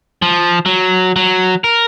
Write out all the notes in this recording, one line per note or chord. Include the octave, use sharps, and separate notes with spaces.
F3
F#3
F#3
A#4